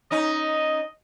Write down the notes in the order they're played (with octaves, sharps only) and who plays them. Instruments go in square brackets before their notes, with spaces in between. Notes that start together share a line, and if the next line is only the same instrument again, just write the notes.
[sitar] C#4 D#4 [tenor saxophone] D#5